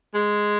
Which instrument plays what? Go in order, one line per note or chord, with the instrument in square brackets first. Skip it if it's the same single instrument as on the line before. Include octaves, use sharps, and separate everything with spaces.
[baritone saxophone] G#3